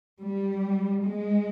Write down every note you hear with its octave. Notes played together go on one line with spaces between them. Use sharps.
G3
G#3